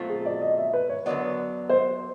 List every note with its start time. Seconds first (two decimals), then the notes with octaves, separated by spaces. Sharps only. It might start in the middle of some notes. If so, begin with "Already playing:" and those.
Already playing: B2 F#3 A3 C4 F4
0.09 G#4
0.25 D5
0.41 D#5
0.58 E5
0.73 B4
0.89 C#5
1.06 F#2 D3 F#3 B3 D5
1.69 C5